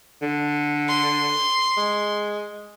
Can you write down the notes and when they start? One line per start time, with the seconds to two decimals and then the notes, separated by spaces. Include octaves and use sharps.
0.22 D3
0.88 C6
1.77 G#3